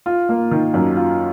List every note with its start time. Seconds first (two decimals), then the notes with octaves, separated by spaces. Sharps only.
0.06 F4
0.29 A#3
0.51 D#3
0.74 F#2
0.97 F4